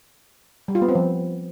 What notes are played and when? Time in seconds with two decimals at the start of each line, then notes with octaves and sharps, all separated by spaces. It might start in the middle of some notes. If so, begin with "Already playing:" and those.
0.68 G3
0.75 F4
0.82 B3
0.88 C4
0.95 F3